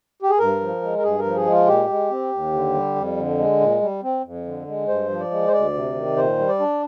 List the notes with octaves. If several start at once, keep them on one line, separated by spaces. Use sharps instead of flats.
G4
G#4
G2 A#4
F3
G#3
A#4
G2 G#4
A#4
F3
G#4
G#3
F4
A#2 G4
G#3
C4
D#2
D3
G3
F2
D3
G#3
A#2
G3
C4
F2
D3
G#3
G2 C5
F3
D5
G#3
C5
D2 D5
C3
D#3
A#2 C5
G3
D5
D4